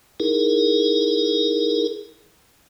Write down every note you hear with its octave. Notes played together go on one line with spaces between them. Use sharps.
D#4 E4 G#4 A#4